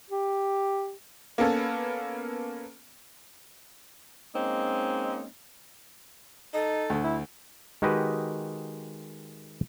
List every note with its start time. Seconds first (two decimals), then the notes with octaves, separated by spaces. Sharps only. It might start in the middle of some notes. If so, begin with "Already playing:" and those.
0.10 G4
1.38 A#3 B3 C#4 A4
4.35 G#3 A#3 C4 C#4 D#4
6.54 D#4 A4
6.90 D2
7.04 E4
7.82 D#3 G#3 F#4 G4 B4 D#5